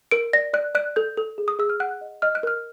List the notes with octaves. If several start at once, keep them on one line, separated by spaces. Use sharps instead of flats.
A#4 D7
D5 A#6
D5 F#6
D5 F#6
A4 G6
A4
G#4
D#6
G#4 E6
F6
F#5 F#6
D#5
D#5 F6
F#6
A#4 F6